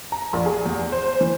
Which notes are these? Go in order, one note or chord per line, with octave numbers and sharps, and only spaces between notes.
A#5
A#1
G#4
E2
C5
E3